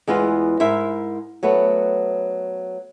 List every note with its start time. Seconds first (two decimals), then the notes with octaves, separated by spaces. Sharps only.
0.07 E2 G#3 B3 F4
0.60 G#2 E4 A#4 E5
1.43 F#3 A3 B3